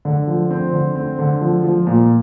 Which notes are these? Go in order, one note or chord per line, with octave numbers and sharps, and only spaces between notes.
D3
F3
C4
D3
C4
D3
F3
F3
A#2